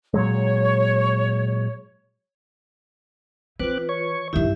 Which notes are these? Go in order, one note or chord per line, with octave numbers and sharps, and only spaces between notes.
A#2 F#3 G#3 C#5
E3 C4 F4 B4 D6 F#6
C#5 C#6
G2 C3 D#3 E4 G4 E5